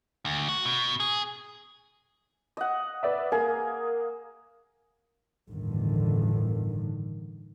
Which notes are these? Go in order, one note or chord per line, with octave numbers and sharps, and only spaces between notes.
D2
F#4
B2
G#4
D#5 F#5
B4 D5 E5
A#3 G#4
G1 E2 A2 D3 D#3